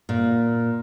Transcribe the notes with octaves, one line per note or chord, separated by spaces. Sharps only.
A#2